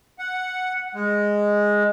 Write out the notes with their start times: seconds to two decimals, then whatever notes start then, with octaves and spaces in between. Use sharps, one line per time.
0.19 F#5
0.95 G#3